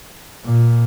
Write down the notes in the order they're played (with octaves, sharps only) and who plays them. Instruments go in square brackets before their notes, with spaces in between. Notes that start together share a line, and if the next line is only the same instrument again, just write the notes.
[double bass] A#2